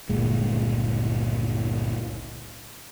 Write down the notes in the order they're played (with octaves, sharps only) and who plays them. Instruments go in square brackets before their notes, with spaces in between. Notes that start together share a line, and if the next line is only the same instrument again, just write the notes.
[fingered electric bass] G1 C#2 A#2 G#3